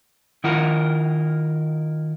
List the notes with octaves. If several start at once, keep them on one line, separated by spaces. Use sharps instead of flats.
D#3 E4 F4 A#4 F#5